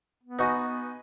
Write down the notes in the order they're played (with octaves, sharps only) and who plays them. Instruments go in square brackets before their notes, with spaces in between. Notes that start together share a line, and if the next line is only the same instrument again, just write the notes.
[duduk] B3
[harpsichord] D#4 F#4 [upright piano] B4 D#5 G#5